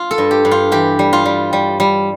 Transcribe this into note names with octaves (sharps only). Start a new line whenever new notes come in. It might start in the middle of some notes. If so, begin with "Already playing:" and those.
Already playing: F4
A4
G2
G4
G2
F4
E3 G4
G3
F4
G3
G3
G3